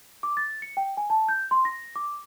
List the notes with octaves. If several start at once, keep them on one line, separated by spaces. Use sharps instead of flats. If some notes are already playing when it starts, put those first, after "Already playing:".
D6
A6
C#7
G5
G#5
A5
G6
C6
A#6
D6